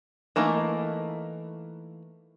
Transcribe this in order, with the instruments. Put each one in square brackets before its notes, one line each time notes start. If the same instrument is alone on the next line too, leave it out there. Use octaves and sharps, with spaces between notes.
[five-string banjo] E3 A3 A#3 D#4